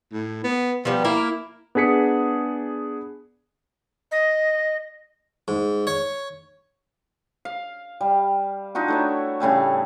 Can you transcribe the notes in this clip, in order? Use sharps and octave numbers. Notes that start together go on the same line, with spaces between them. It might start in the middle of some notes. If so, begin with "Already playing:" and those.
A2
B3
F3 G3 B3
A#3 E4 A#4
B3 D4 G#4 B6 C#7
D#5
G#2
C#5
F5
G3
D4 D#4 F4 F#4
A3 E4 C#5
A2 C#3 G3 A3